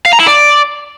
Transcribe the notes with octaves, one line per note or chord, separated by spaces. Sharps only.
F5
A#5
E4
D5